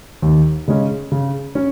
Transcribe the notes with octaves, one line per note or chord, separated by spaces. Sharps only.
D#2
C#3 G#3 C#4
C#3
C#4